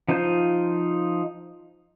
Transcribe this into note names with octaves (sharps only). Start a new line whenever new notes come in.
F3 D#4 F4 C5 G6